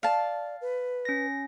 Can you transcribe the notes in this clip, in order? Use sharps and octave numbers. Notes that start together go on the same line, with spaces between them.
D5 F5 A5
B4
C#4 A#6